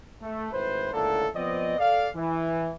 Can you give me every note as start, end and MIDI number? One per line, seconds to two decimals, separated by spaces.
0.22 0.52 57
0.53 0.91 32
0.53 0.91 45
0.53 0.91 71
0.53 0.91 72
0.93 1.27 37
0.93 1.27 45
0.93 1.27 50
0.93 1.27 58
0.93 1.27 62
0.93 1.27 69
1.35 1.74 53
1.35 1.74 59
1.35 1.74 60
1.35 1.74 74
1.35 1.74 75
1.79 2.08 69
1.79 2.08 74
1.79 2.08 77
2.15 2.73 52